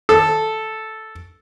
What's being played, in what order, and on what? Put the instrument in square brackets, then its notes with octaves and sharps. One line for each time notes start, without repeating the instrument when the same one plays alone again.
[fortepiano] A4